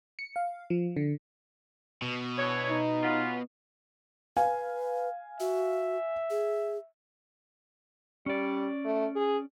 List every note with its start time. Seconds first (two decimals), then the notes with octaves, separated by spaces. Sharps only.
0.19 C#7
0.36 F5
0.70 F3
0.97 D3
2.02 B2
2.37 E3 D4 C#5
2.69 D#4
3.02 B3 C#4 F4
4.37 B4 F5 G#5
5.40 F#4 E5
6.30 G#4
8.26 G3 C#4 D5
8.85 A3
9.16 G#4